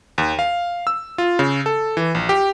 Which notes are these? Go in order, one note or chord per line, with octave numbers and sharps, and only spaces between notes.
D#2
F5
E6
F4
C#3
A4
E3
A#1
G4